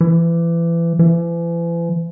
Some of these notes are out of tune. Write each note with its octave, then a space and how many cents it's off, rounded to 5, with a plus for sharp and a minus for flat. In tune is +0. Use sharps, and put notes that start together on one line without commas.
E3 +30
E3 +40